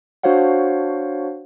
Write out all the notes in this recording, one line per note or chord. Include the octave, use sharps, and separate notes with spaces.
D4 F#4 C5 C#5 F5 F#5